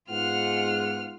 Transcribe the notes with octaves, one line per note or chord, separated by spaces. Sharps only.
G#2 B3 F4 F#5 F6